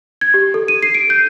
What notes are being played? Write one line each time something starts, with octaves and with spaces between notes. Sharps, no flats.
G#6
G4
A4
D#7
C7
D7
G6